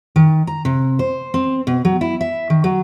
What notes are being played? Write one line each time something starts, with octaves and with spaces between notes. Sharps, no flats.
D#3
A#5
C3
C5
C4
B2
F#3
E4
E5
D#3
F#3